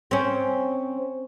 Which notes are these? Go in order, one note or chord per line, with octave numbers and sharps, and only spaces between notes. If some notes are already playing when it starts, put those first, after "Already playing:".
C4 C#4